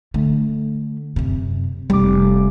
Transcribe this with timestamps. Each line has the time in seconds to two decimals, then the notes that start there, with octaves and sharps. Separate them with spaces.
0.14 D3 A3
1.16 F#2 C3
1.90 F1 G3 D6